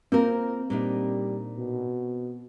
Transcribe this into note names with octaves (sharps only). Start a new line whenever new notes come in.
A#3 C4 F4 A#4
A#2 G3 D4 D#4
B2